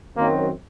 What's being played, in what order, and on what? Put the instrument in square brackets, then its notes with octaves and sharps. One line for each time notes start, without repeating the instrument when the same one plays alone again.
[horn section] F#2 D#3 F#3 C4 [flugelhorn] A#3